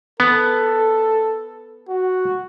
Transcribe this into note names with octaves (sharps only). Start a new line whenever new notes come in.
B3 A4
F#4